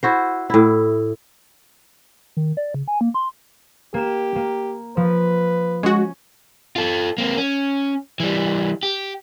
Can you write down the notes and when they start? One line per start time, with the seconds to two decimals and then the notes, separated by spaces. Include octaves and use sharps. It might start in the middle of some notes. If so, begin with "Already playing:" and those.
0.03 E4 F#4 C5
0.50 A2 E4
2.37 D#3
2.57 D5
2.74 C#3
2.88 G#5
3.01 A#3
3.14 C6
3.94 A#3 G4 E7
4.36 A#3
4.97 F3 B4
5.83 G#3 C#4 F#4
6.76 F4 A4
7.18 A#3 C4
7.38 C#4
8.20 E3 G3
8.83 G4